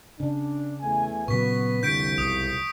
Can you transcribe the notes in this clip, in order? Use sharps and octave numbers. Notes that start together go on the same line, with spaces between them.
C#3 D4
E2 A3 G#5
A#2 C#3 F#3 B3 B4 C#6 B6
C2 F2 D3 G6 B6 D7
B1 D#6